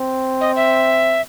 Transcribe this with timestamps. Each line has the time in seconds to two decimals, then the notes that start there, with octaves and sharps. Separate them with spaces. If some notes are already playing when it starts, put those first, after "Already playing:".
Already playing: C4
0.41 D#5
0.56 E5